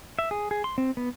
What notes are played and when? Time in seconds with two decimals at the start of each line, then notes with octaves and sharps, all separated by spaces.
0.19 E5
0.31 G#4
0.51 G#4
0.64 C6
0.78 C4
0.97 B3